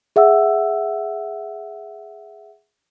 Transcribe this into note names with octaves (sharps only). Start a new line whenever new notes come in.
G#4 E5 F#5 E6